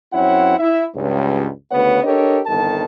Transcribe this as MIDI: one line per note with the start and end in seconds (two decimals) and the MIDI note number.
0.13 0.57 42
0.13 0.57 60
0.13 0.57 64
0.13 0.57 73
0.13 0.57 78
0.59 0.85 64
0.59 0.85 76
0.96 1.48 37
0.96 1.48 43
1.72 2.02 38
1.72 2.02 49
1.72 2.02 59
1.72 2.02 71
1.72 2.02 73
1.72 2.02 78
2.04 2.40 62
2.04 2.40 67
2.04 2.40 69
2.04 2.40 70
2.04 2.40 73
2.04 2.40 75
2.46 2.84 31
2.46 2.84 36
2.46 2.84 51
2.46 2.84 69
2.46 2.84 81